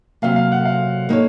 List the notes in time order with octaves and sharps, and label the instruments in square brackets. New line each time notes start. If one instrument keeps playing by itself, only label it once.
[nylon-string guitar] C3 F#3 A#3 [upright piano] F5
[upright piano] F5
F#5
F5
[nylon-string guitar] A#3 D#4 A4 C#5